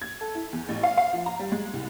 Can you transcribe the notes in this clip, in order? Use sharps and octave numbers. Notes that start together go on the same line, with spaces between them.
G#6
A4
E4
E2
A1
F5
F5
F3
A#5
G3
G#3
C2